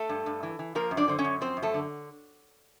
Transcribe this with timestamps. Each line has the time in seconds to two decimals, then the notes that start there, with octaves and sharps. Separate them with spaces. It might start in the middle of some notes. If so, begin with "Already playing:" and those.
Already playing: A3 A4
0.09 G2
0.26 G2
0.43 E3
0.59 E3
0.75 F3 A#3 A#4
0.91 F#2
0.97 D4 D5
1.08 D3 C5
1.19 C#4 C#5
1.24 F#2
1.41 F3 C4 C5
1.57 F#2
1.63 A3 A4
1.74 D3